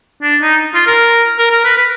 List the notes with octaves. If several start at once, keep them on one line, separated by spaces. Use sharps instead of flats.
D4
D#4
F4
A#4
A#4
A#4
B4
B4